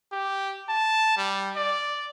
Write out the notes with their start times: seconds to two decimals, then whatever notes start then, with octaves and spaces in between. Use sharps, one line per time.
0.12 G4
0.69 A5
1.17 G3
1.57 D5